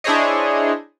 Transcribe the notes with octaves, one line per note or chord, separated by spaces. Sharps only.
D4 E4 G#4 C5 C#5 D#5